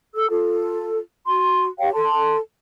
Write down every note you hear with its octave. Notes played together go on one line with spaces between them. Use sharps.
A4 E6
F4 A4
F#4 C6
G4 C#5 F5 G5
A4 A5 C6